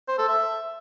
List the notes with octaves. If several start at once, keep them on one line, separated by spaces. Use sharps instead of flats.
C5
A4
E5